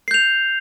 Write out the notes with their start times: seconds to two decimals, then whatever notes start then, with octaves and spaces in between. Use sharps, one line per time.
0.08 C7
0.11 G6
0.14 F7